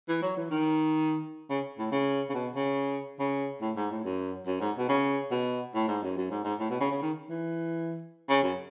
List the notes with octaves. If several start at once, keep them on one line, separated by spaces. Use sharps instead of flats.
E3
F#3
E3
D#3
C#3
A2
C#3
C#3
B2
C#3
C#3
A2
G#2
A2
F#2
F#2
G#2
B2
C#3
B2
A2
G#2
F#2
F#2
G#2
G#2
A2
B2
C#3
C#3
D#3
E3
C#3
F#2